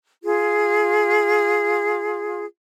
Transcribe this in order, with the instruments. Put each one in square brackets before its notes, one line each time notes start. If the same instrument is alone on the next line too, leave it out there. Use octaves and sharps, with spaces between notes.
[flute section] F4 G#4